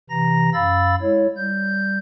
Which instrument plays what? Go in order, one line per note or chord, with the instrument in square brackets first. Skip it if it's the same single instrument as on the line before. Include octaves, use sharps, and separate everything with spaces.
[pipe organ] C3 E3 A#5 A#6
F#2 F5 B5 E6 A6
G#3 E4 C#5
G3 G6